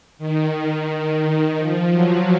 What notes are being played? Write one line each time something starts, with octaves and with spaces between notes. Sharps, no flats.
D#3
F3
F#3